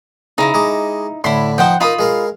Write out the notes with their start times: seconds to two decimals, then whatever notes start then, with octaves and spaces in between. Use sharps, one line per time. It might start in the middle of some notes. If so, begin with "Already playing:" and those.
0.38 C#3 D#4 E4 A#5
0.54 G#3 D#5 D6
1.24 A2 D3 E4 B5 C6
1.58 F3 D#4 C5 F#5 G5
1.81 D#4 F4 A#4 B5 D#6
1.99 G#3 A#4 F5